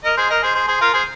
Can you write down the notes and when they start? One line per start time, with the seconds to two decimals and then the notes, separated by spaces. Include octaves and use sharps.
0.04 A#4 D#5
0.17 G#4 C5
0.30 A#4 D#5
0.43 G#4 C5
0.55 G#4 C5
0.68 G#4 C5
0.81 F4 A#4
0.93 G#4 C5